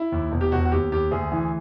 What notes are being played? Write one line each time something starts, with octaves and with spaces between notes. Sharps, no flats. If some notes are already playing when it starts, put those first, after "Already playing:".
Already playing: E4
D#2
E1
G4
E1 F#4
F#4
D#2 G4
D#2 G4
D2 G#4
E3